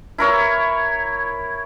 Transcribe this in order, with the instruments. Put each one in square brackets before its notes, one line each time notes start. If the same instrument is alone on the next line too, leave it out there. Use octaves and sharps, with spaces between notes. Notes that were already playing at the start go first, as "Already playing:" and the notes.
[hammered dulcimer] E4 A#4 C#5